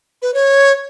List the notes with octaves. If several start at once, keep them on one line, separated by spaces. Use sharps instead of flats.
B4
C#5